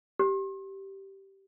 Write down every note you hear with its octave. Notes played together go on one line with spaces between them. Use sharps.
G4